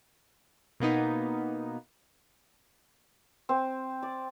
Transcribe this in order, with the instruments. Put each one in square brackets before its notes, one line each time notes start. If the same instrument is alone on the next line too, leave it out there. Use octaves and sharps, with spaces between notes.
[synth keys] B2 A#3 B3 D#4
[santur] C4
D5